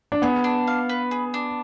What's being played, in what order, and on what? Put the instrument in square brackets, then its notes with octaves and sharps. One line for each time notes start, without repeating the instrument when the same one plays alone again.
[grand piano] D4
[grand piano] B3 [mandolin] G#4
[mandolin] D4
F5
B4
G#4
D4